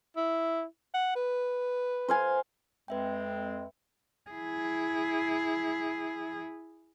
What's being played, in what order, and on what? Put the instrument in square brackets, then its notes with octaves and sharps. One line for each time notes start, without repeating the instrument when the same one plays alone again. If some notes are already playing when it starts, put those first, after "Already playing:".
[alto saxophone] E4
F#5
B4
[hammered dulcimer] C5 F5 G#5
[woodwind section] F2 G#3 C4 [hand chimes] B4 E5 G5
[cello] E4 G#4